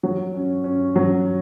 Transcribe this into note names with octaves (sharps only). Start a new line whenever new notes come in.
F#3
C#4
C#4
F#3